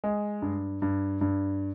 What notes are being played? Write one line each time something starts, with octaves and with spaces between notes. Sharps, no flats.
G#3
G2
G2
G2